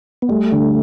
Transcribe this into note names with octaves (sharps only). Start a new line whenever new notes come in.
B3
G3 A3
D3